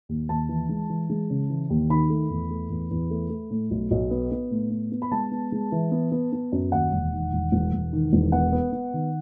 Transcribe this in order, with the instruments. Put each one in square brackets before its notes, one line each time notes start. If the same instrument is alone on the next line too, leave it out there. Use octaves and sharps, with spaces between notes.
[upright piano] D#2
D#2 A5
E3
G#3
E3
G#3
C#3
E3
D#2
D#3 B5
A3
E2
A3
E2
E2
A3
A3
A2
B1
B1
B3
B3
A2
B3
B3
B5
G#3 A5
B3
G#3
E3
B3
B3
B3
F#2
D#2 F#5
E1
D#3
E1
E1
E1
D#3
E1
B3 F#5
B3
B3
D#3